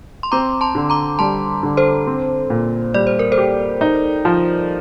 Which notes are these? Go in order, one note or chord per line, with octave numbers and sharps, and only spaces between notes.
C6
C4 A#5 D6
A5 C6
D3
A#5 D6
G3 A5 C6
D3
A4 C5
C4
A#2
G3 D5
C5
A#4
A4 C5
G4
D#4
F3